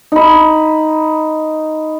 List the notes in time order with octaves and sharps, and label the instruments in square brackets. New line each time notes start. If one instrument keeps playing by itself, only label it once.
[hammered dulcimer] D#4 B5